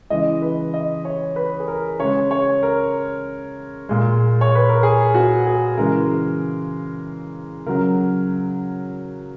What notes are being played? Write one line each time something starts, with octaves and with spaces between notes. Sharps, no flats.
C#3 E3 G#3 D#5
B4
D#5
C#5
B4
G#4
A#4
C#3 G#3 C#5
C#5
A#4
A#2 G#3
C#5
B4
A#4
G#4
F#4
G#4
C#3 E3 G#3 A#4
C#3 F#3 A#4